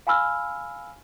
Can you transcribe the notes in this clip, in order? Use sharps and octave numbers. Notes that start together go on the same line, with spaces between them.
F5 G#5 B5 E6 F6